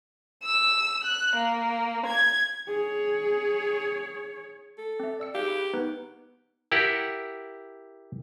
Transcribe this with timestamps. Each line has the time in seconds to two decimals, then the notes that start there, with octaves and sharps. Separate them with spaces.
0.44 E6
1.04 F#6
1.36 A#3
2.06 G#6
2.68 G#4 C#5
4.78 A4
5.00 C4 E5
5.20 D5 E6 C#7
5.35 G4 G#4 F5
5.48 B5
5.74 B3 D#4 B4
6.72 E4 G4 A#4 F#5